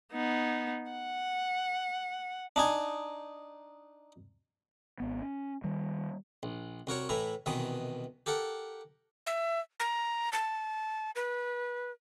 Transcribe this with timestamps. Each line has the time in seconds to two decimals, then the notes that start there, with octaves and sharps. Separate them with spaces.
0.13 B3 D#4
0.91 F#5
2.56 D4 D#4 G#5
5.00 G#1 B3
5.22 C#4
5.64 D#3 G3
6.43 A#1
6.87 C2 F#4 A#4 C#5
7.09 A2 E3 E4 A#5
7.46 C2 B2 D#3 E3 D#5
8.26 G4 A4 A#4 F#5
9.27 E5
9.80 A#5
10.33 A5
11.16 B4